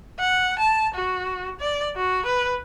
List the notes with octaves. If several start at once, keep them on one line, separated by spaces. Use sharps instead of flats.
F#5
A5
F#4
D5
F#4
B4